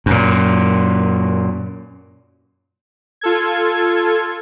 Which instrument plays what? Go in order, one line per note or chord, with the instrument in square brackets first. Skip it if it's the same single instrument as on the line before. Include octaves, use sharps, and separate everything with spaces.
[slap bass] F#2 A#2
[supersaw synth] F4 A4 G#6